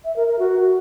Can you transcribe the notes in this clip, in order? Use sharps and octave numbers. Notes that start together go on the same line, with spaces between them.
E5
A#4
A#4
F#4